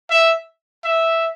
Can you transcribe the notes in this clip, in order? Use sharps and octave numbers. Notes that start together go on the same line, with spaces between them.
E5
E5